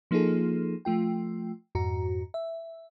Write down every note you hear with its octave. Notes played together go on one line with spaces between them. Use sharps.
F3 A#3 D#4 F4 G#4 A4
F3 A3 F4 G5
F2 G#2 F#4 A#5
E5